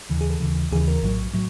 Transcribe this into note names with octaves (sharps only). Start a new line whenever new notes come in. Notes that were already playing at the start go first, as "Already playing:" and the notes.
D#2 C#3 E3
G#4
A4
D#2 C#3 E3
D#2 C#3 E3 G#4
A#4
A#1 A2 F#3
A2 F#3